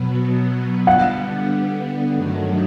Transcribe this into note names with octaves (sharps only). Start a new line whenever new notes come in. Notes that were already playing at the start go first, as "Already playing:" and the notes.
Already playing: B2 F#3 B3
D3 G3 B3 F#5
G2 D#3 F#3 A3